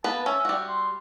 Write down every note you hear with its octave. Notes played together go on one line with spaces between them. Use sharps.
A#3 B3 B4 A5
C#4 E5
G3 F#4
C6